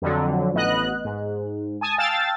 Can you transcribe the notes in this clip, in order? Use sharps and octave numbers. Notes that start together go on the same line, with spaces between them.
F2 D3 F#3
A1 B3 D#5 F#6
G#2
G#5 A5 D#6
F5 G5 A5 E6 A6